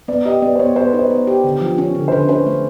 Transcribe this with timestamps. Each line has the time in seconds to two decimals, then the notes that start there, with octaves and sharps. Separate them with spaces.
0.08 B3 D5
0.25 G4 D#5
0.42 B3 D5
0.55 C5
0.59 B3 C#5
0.76 B3 C5
0.88 B4
0.93 D#4
0.99 C5
1.10 B3
1.27 G4
1.44 D3
1.61 F3
1.78 C#4
1.95 D3
2.08 C5
2.12 D3 B4
2.29 C#4 C5
2.47 A3